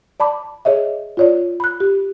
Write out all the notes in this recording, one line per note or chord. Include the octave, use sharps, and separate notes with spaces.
D5 A5 B5 D6
G#4 C#5 D#5 E5
F4 C#5 D5
B5 F#6
G4